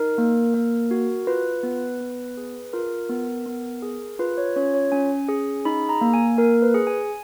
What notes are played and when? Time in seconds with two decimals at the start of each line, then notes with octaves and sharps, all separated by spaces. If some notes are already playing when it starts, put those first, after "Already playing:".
Already playing: D#4 A#4
0.18 A#3
0.54 A#3
0.91 F#4
1.27 F4 B4
1.63 B3
2.00 B3
2.37 G#4
2.73 F4 A#4
3.09 B3
3.46 B3
3.83 G#4
4.19 F4 B4
4.38 C#5
4.56 C#4 C#5
4.74 C#5
4.92 C#4 G#5
5.29 G#4
5.65 D#4 B5
5.89 A#5
6.01 A#3
6.14 G#5
6.37 A#3 A#4
6.62 B4
6.74 G#4
6.87 G#5